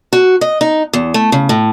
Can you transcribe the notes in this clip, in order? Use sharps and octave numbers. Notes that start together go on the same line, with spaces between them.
F#4
D#5
D#4
E2
A3
C#3
A2